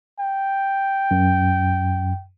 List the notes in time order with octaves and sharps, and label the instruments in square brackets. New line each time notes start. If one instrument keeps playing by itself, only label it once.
[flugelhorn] G5
[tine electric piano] F#2